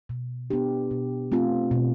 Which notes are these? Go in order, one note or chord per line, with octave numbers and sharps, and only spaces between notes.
B2
B3 D4 G4
B2
A3 C4 F4
B2